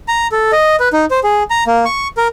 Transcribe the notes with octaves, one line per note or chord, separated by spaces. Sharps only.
A#5
A4
D#5
B4
D#4
C5
G#4
A#5
A#3
C#6
A#4